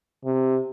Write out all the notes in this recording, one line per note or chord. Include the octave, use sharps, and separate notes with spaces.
C3